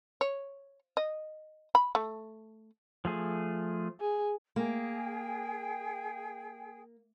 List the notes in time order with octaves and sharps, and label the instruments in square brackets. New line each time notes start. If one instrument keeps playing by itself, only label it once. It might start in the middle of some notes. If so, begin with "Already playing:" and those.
[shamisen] C#5
D#5
B5
A3
[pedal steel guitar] F3 A3 G#4
[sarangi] G#4
[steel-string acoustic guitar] A#3 [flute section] G#4 G5